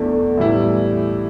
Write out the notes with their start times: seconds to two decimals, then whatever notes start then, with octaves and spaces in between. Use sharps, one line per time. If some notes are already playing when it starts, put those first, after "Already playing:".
Already playing: E2 B2 A3 D4 A4
0.37 A2 E3 G3 E4